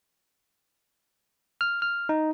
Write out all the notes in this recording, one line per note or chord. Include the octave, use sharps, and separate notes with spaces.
F6
F6
D#4